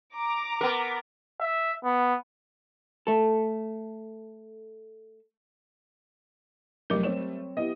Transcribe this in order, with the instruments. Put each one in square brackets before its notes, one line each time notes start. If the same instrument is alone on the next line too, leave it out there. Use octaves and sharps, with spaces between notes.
[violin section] A#5 D6
[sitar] B3 A#4
[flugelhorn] E5
B3
[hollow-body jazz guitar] A3 A4
[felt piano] F1 [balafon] F#3 A#4 [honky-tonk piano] G3 A3
[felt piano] C4 C#5 E7
[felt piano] B3 E4 G4 [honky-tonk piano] D#5